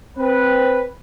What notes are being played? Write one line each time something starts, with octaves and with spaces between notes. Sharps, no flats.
C4 B4